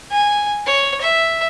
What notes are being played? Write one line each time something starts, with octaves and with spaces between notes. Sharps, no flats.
G#5
C#5
E5